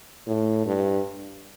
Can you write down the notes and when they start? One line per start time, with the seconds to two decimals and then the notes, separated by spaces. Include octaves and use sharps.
0.27 A2
0.66 G2